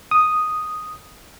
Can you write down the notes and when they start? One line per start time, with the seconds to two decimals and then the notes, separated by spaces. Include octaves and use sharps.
0.11 D#6